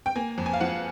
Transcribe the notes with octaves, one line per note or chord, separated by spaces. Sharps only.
G5
A#3 G#5
F2
G#5
F5
F3 F#5